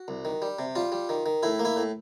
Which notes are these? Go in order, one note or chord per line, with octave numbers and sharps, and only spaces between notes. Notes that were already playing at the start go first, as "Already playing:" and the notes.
Already playing: F#4
C2
D#3
G3
C3
G3 F4
G3
D#3
D#3
A2 E4
A#3
E4
A2